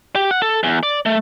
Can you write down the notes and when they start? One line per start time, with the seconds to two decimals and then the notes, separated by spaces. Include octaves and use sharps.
0.16 G4
0.31 F#5
0.42 A4
0.64 E2
0.83 D5
1.06 A3